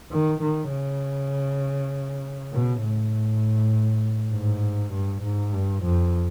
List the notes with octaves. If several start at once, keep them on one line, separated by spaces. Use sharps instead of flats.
D#3
D#3
C#3
B2
A2
G#2
G2
G#2
G2
F2